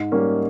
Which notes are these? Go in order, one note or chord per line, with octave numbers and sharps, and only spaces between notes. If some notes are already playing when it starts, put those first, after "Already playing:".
Already playing: G#2
G3 A#3 C#4